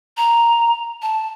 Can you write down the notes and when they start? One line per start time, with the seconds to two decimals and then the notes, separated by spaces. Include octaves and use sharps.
0.17 A#5
1.02 A5